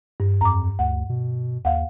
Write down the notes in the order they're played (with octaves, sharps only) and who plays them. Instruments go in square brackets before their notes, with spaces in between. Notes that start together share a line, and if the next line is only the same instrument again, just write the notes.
[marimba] G2
[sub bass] F2 [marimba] A#5 D6
[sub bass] D2 [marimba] F#5
[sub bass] B2
[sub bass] D#2 [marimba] F5 F#5